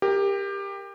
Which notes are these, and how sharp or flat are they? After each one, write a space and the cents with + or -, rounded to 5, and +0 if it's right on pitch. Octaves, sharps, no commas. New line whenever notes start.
G4 +20 A#4 +0